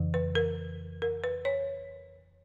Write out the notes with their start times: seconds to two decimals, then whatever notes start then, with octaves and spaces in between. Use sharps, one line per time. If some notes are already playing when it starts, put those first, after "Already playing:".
Already playing: F2 C#3 E3
0.14 B4
0.35 A#4
1.02 A#4
1.24 B4
1.45 C#5